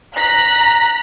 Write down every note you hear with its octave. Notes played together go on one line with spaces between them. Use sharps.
A#5 F#6 B6